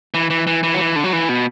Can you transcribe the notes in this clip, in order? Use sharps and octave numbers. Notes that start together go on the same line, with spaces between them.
E3
E3
E3
E3
F#3
E3
D3
F#3
E3
B2